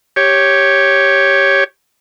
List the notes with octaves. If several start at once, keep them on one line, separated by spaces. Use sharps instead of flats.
G4 C#5